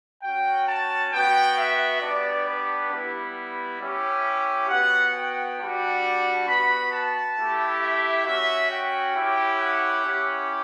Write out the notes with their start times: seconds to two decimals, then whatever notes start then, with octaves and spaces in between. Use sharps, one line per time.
0.22 C#4 F#4 G5
0.67 A5
1.12 B3 F#4 G5
1.57 E5
2.01 B3 D4 G4 D5
2.46 B4
2.91 G3 B3 E4
3.80 C#4 E4 G4
4.68 B3 F#4 F#5
5.14 G5
5.58 G3 D4 F#4
6.47 B3 F#4 B5
6.92 A5
7.36 A3 E4 G4
7.80 E5
8.25 C#4 F#4 E5
8.70 G5
9.14 C#4 E4 G4
9.58 F#5
10.03 C#4 E4 G4